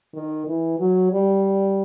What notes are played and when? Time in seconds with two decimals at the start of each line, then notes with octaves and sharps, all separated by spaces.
0.14 D#3
0.47 E3
0.79 F#3
1.13 G3